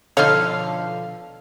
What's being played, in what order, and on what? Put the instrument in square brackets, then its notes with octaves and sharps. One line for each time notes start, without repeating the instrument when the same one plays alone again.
[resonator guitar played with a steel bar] B2 D3 F3 [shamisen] D#4 C#5 [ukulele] A4 [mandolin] F5 F6